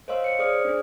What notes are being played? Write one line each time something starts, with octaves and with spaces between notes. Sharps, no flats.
C5 C#5 D#5 F5 C6 E6
C#5 C#7
G#4 C5 D5 D#6 F6
D4 G#4